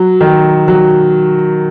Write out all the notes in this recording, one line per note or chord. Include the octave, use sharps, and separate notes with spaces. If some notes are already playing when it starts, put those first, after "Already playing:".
Already playing: F#3
D#3
F#3